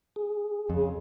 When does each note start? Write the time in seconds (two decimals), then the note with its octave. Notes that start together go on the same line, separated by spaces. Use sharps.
0.16 G#4
0.70 F2 C#3